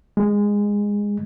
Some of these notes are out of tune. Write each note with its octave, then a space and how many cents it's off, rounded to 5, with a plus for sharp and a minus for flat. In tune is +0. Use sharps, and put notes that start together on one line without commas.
G#3 -15